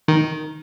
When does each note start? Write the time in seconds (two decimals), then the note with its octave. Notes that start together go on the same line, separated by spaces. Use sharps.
0.08 D#3